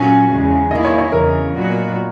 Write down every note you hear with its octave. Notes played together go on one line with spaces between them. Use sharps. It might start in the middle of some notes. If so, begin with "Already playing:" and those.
Already playing: A#2 F#3 C#4 F#4 G#5
E2 C#3 G#3
D#3 A#3 E4 D#5
C#5
C#5
E2 C#3 E3 A#4
A#2 F#3 B3 F#4